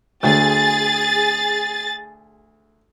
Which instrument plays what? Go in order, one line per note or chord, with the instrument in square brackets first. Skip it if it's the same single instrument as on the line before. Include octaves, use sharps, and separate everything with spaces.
[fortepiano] D2 [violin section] G#4 A6